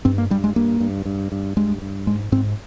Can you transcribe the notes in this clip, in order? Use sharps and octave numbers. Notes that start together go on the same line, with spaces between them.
G2 C4
A#3
G2 G3
G#3
G2 A#3
G2
G2
G2
G2 G#3
G2
G#2 G#3
G#2 C4